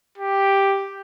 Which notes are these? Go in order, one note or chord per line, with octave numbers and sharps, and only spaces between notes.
G4